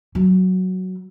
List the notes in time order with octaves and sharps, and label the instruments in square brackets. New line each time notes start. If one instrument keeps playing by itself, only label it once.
[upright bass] F#3